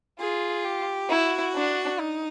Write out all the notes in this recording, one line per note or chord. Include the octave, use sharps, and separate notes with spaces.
F4 G#4
G4
E4 F#4
D4
D#4